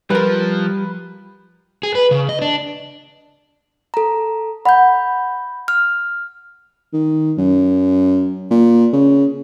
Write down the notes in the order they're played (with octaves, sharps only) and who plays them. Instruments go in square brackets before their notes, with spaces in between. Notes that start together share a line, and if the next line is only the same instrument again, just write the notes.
[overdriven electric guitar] F3 [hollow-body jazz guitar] G3 A#4 [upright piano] B4
[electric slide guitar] G#4
B4
C#3
D#5
D4
[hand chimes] A4 A#5
[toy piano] F#5 [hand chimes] B5 G6
[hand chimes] F6
[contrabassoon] D#3
F#2
A#2
C#3